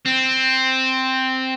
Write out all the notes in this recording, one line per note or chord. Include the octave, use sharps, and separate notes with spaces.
C4